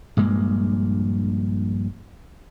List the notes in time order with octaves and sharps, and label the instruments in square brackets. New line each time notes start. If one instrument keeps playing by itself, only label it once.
[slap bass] A#1 G2 G#3 A#3